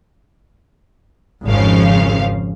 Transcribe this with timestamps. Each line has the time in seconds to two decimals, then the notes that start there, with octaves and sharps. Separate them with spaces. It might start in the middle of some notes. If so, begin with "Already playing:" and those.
1.45 G#1 F2 C#3 F3 F5